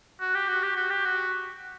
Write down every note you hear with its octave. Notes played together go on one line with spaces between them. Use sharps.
F#4
G4
F#4
G4
F#4
G4
F#4